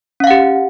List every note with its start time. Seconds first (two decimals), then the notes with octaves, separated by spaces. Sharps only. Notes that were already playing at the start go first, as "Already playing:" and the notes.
0.20 C#4
0.24 F5
0.27 F#5
0.31 G4